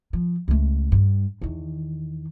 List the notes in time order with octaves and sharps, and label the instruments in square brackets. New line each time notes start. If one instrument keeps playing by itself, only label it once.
[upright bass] F3
C#2 A3
G2
E2 D#3